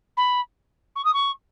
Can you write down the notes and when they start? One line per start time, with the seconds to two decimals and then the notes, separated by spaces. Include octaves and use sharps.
0.17 B5
0.96 C#6
1.05 D#6
1.14 C#6